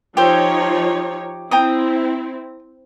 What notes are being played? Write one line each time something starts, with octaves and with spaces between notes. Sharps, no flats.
F3 D#4 G4 C5 C#5 E5
C4 E4 G5 A#5 D#6